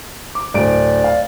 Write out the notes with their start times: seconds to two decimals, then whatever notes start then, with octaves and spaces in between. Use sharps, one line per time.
0.35 D6
0.54 D1 D5 D7
1.04 F5